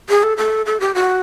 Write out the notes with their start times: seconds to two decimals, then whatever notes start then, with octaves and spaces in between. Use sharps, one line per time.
0.09 G#4
0.23 A4
0.37 A4
0.66 A4
0.80 G4
0.95 F#4